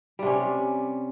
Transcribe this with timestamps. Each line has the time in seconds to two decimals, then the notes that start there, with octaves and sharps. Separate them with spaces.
0.19 G3
0.23 C3
0.26 C#4